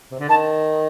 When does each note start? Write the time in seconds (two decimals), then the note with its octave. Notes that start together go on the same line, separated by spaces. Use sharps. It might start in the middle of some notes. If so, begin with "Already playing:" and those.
0.11 C3
0.19 D3
0.29 D#3 A5